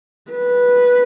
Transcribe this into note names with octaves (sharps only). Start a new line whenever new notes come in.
B4